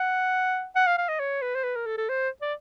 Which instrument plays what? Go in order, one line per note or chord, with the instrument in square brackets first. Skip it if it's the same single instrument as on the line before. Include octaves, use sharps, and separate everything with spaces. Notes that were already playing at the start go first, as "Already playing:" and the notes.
Already playing: [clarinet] F#5
F#5
F5
F5
D#5
C#5
B4
C5
B4
A#4
A4
A4
C5
D5